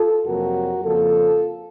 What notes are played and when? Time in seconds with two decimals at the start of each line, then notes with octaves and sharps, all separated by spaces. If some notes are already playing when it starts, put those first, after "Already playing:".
Already playing: F4 A4
0.26 F2 C3 F#3 A#3 F#4 A#4
0.84 F2 C#3 F3 A#3 F4 A4